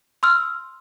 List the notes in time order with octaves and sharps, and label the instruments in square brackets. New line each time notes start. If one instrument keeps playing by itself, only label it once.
[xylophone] C6 E6 F6